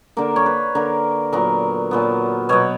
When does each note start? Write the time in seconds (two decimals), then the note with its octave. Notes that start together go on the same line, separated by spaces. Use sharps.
0.17 D3 A#3 A#4
0.36 C#5
0.46 B4
0.75 D3 A#3 A#4
1.33 A#2 F#3 B3 A#4
1.91 A#2 F#3 B3
2.49 B2 F#3 B3 C#5